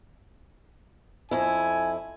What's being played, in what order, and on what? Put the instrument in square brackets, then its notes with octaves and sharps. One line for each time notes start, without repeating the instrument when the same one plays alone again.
[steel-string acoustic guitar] F2 E4 [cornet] G#5